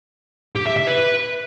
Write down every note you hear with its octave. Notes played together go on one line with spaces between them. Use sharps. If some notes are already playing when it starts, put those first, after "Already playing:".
G4
E5
E5
B4